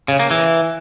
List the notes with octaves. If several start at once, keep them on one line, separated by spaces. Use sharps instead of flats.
C#3
A#3
E3